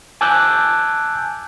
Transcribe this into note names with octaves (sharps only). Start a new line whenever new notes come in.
G#5 A5 D6 E6 F#6 G6